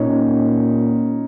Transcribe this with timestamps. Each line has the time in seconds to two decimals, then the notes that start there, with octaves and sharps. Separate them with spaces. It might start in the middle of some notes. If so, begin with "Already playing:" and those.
Already playing: A#2 C#4 D#4